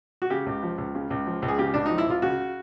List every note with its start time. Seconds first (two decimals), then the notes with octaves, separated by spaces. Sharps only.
0.22 F#4
0.30 C#3 G4
0.46 C#2
0.63 F3
0.78 C#2
0.95 C#3
1.10 C#2
1.26 F3
1.42 C#2
1.48 G#4
1.58 C#3 G4
1.74 C#2 D4
1.86 F3 D#4
1.98 E4
2.06 C#2 F4
2.22 C#3 F#4